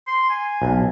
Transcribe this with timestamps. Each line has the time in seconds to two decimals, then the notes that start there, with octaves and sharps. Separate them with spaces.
0.07 C6
0.30 G#5
0.62 B1